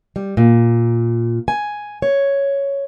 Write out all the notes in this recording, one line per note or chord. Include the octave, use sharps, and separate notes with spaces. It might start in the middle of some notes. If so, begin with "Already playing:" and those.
G3
A#2
G#5
C#5